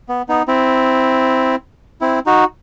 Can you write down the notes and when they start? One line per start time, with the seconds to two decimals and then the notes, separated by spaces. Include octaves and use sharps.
0.09 B3
0.28 B3 D#4
0.48 C4 E4
2.01 C4 E4
2.26 D#4 F#4